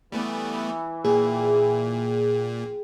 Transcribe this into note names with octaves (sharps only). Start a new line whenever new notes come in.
E3 G3 A3 B3
A#2 G#4 G5